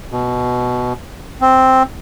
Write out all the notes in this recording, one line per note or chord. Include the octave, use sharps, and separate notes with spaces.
B2
C4